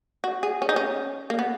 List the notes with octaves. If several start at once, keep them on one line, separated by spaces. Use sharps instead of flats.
F#4
G#4
C#4
D#4
C#4
A#3
B3